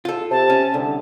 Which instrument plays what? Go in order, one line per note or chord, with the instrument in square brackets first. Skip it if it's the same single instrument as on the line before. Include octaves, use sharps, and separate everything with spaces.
[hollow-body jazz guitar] F4 A4
[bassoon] C3 [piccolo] A5
[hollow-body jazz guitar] C#4
[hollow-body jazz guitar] C2 [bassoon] D3